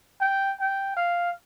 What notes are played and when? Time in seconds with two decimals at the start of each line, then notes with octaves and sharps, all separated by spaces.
0.21 G5
0.60 G5
0.97 F5